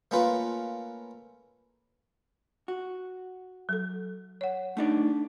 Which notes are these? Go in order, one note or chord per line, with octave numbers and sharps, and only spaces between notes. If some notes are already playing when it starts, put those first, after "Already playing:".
A3 A#3 C#4 F4 B4
F#4
F#3 A4
C#5 F#5
A3 D4 D#4 D5